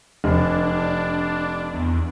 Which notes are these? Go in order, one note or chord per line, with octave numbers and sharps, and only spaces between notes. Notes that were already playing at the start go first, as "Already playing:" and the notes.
F1 D4
E2